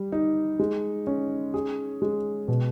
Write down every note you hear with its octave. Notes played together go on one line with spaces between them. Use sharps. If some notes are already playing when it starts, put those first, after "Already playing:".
Already playing: G3
D#4
G#3
C#4
G#4
G#3
B2